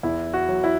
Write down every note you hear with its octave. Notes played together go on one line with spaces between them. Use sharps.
E2 E4
F#4
F#3
E4